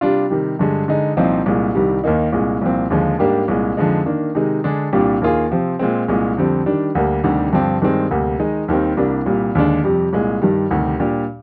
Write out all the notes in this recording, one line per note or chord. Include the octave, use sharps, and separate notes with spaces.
C3 G3 D4 F4
C3 D#3 G3
G2 D3 G#3
D3 G#3 D#4
C2 A#2 F3 C4 D#4
C2 A#2 G#3
C2 C3 D#3 G3
D#2 D#3 A#3 D#4
C2 A#2 G#3
C2 A#2 F3 C4
D#2 D3 F3 G#3
G#2 G3 A#3 D4 G4
C2 A#2 G#3
F2 D3 F3 G#3 D#4
D#3 A#3 D4
C3 D#3 G#3 D#4
D3 G#3 D4 G#4
C2 A#2 G3 D4 G4
D#2 D#3 A#3 F4 G#4
C3 F3 C4
A#2 G#3 C4
C2 A#2 G#3
F2 D3 G3 C4
D#3 G3 D4
D2 D3 G3 A#3
D2 C3 D#3 G3 D4
G2 D3 F3 C4 G4
G2 D#3 G#3 C4
D2 C3 G3 A#3
D#3 G#3 D#4
D#2 D#3 G3 C4
C2 C3 G3 A#3 D4
C2 A#2 G3
D#2 D3 G#3 D4
F2 C3 G3
C2 A#2 G#3
G2 D#3 G3
D2 C3 D#3 G3
A#2 G3 D4 G4